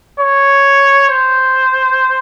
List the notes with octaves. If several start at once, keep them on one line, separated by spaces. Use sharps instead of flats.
C#5
C5